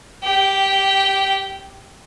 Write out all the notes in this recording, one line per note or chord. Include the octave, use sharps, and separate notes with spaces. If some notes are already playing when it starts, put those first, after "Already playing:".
G4 G5